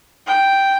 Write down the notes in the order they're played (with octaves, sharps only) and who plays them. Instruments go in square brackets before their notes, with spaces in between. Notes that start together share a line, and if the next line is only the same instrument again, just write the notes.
[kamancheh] G5